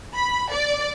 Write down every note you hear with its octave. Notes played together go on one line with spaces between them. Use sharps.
B5
D5